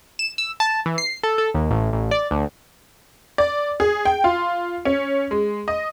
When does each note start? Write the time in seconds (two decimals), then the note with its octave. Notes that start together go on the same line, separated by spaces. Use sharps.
0.19 E7
0.38 E6
0.60 A5
0.86 E3
0.98 C7
1.23 A4
1.38 A4
1.55 D#2
1.70 A1
1.93 A1
2.11 D5
2.31 D2
3.38 D5
3.80 G#4
4.05 G5
4.24 F4
4.85 C#4
5.31 G#3
5.68 D#5